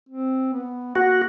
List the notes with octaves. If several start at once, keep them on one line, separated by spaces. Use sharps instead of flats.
C4
B3
A#3 F#4